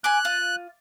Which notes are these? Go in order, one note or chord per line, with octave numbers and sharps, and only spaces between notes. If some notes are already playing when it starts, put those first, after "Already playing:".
G#5 D6 F#6
F4